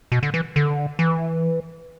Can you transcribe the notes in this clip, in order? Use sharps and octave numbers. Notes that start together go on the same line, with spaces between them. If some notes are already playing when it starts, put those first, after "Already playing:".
B2
D3
E3
D3
E3